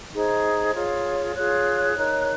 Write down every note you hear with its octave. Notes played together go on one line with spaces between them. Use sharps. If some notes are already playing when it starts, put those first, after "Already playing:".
D#4 G#4 C5
F4 G#4 C#5
F4 G#4 C#5 F#6
D#4 A#4 C#5